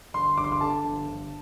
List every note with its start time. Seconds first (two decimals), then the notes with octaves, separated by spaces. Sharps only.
0.14 G1 C6
0.37 G1 D6
0.44 C6
0.52 D6
0.60 D3 A5
0.84 G1
1.07 G1